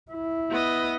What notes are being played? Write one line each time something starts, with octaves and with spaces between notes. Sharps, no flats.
E4
B3 D#5